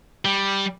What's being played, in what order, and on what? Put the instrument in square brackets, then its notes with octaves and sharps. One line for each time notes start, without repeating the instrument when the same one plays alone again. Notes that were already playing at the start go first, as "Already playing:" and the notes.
[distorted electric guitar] G3